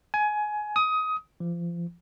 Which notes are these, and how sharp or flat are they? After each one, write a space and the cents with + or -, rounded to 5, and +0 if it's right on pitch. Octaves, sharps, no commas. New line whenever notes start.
G#5 +20
D#6 +20
F3 -30